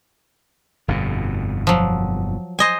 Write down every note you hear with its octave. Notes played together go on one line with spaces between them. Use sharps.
G1 F2 B2
F3 F#3
C5 D#5 G#5